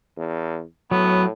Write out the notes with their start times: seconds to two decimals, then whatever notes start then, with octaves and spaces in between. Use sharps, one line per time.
0.17 E2
0.91 A2 F#3 B3